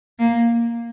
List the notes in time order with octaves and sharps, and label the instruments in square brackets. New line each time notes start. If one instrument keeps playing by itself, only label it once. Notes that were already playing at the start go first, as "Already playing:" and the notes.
[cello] A#3